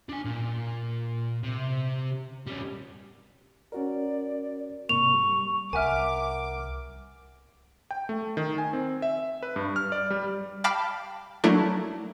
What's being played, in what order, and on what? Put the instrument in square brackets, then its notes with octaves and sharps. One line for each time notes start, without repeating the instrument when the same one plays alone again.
[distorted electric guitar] D4 G#5
A#2
C3
G3 C#4
[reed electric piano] C#4 F#4 A#4 [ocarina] D5
[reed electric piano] G#2 C3 A#3 [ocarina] C#6 [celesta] F7
[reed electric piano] G3
[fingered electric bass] C2 [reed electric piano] A#4 F#5 F6 [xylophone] E5 G#5 [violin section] D6
[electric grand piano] G5
A3
D#3
G#5
C4
E5
B4
G2
F6
D5
G3
[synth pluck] F5 G5 A5 B5 D6 F6
F#3 A3 A#3 D4 E4